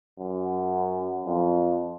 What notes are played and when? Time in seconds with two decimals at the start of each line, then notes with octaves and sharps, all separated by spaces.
0.18 F#2
1.26 F2